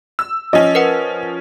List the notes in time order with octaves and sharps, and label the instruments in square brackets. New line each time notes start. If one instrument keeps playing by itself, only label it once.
[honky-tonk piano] E6
[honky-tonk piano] F3 C#4 [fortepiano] D#5
[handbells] A#4 B4 F#5